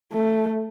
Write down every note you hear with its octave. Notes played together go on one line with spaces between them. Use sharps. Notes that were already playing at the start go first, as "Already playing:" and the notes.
A3